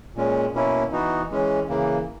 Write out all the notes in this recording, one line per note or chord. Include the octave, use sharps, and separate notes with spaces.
A#2 G#3 C#4
B2 A#3 C#4 E4
E3 B3 D#4 F#4
E3 G#3 C#4
C#3 E3 A#3